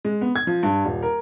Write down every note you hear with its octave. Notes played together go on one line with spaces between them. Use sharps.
G#3
B3
G#6
F3
G2
D#1
A#4